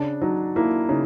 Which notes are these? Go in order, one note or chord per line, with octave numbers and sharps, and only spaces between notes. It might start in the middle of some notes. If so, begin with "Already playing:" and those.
Already playing: C#3 D4
F#3 D#4
A#3 E4
C#3 D#4